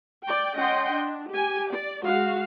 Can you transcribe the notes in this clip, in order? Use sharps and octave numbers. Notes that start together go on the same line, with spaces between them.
D5 G5
C#4 D#5 F#5 G5 C6
D4
G4 G#5
D5
G#3 F#4 F5